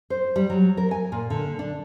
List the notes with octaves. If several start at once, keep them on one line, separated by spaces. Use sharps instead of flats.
C5
G3
F#3
A#4
G#5
A#2
D3
D4